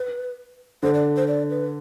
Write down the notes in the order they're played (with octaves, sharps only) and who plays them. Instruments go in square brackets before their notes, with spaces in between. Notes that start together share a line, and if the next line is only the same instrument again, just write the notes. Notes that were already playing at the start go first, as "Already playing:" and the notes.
Already playing: [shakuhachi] B4
[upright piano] D3 [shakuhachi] C5
[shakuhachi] D5
C5
D5
B4